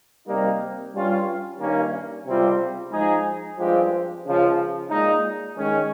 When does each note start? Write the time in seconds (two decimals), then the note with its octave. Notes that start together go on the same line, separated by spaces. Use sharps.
0.28 C3 G3 A#3 D#4
0.94 G2 G3 C#4 F4
1.60 G2 D#3 A#3 C#4
2.26 C#2 C3 G3 C4 F4
2.92 F3 G#3 D#4 G#4
3.58 G2 F3 G#3 C4 G4
4.25 C#2 C#3 F3
4.90 A#2 G#3 D#4
5.57 D#3 G#3 C#4